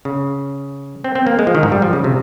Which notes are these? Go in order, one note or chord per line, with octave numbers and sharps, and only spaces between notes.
C#3
C4
C4
A#3
G#3
F3
D#3
G#2
G3
F3
C#3
C3